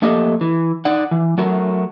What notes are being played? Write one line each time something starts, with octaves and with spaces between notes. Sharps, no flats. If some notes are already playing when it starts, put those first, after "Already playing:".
F2 A3 A#3 G4 A4 D#5
E3
D#4 D5 F#5
E3
F#3 A3 F#4 A#4